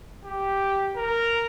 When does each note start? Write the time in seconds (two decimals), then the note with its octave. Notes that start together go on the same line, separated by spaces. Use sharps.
0.25 G4
0.96 A#4